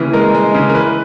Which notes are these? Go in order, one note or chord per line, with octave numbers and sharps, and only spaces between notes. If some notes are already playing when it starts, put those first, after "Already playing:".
Already playing: D#2 C#3 E3
G#3 A#4
G#3
C#3
A#4
E3 B4